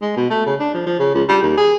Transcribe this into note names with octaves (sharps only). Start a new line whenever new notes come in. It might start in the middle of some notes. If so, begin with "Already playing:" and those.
G#3
B2
A3
C#3
D4
F3
F3
C#3
C#2
G3
D#2
G#4